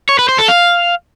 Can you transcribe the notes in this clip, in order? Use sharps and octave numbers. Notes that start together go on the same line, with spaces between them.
C#5
B4
C5
A4
F5